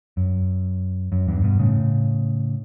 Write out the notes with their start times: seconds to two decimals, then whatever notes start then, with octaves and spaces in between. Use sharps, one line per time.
0.17 F#2
1.12 F#2
1.28 E2 G2
1.44 G2 B2
1.59 A2 C#3